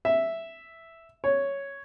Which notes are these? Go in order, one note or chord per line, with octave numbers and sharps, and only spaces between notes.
E5
C#5